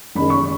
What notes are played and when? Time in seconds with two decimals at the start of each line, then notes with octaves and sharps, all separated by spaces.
0.15 F#1 F#2 D#3 G#3 B5
0.30 C#6